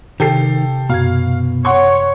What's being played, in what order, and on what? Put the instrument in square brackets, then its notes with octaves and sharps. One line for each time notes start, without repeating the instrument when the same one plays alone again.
[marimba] C3 [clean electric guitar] D#3 [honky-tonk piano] G4 A4 C7
[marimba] F#2 F#4 G#6 [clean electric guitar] B2 [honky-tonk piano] F5
[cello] C#5 [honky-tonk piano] F#5 C6 C#6